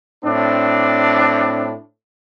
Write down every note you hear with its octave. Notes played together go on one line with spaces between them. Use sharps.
A2 C4 D4